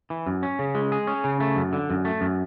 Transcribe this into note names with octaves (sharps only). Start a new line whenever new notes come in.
E3
F#2
C#4
C#3
G#3
G#4
C#4
C#3
A3
F#2
D3
F#2
A3
F#2